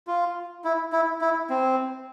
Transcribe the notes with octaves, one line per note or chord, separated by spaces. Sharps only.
F4
E4
E4
E4
C4